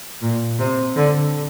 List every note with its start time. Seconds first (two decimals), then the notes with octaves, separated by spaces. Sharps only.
0.21 A#2
0.59 C3
0.96 D3